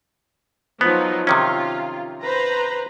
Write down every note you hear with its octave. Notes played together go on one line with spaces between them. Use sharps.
F3 F#3 B3 D#4
C3 D#3 C#4 F4
B4 C5 A#5